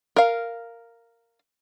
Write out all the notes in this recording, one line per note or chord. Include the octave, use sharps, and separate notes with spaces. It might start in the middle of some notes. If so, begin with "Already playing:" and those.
A#4 F5